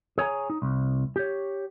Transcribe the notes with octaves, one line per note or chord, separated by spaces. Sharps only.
G#4 C#5 G#5 A#5
D#4
C2
G4 C#5